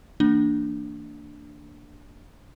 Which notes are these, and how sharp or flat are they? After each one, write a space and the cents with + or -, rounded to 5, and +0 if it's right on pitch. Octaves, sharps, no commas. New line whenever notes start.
E3 -20 A#3 -30 D4 +0